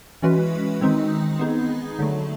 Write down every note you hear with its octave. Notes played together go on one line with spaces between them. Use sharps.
E3 G#3 C#4 F#4 B4
D#3 G#3 C4 D#4
B3 D#4 G#4
D3 F#3 A3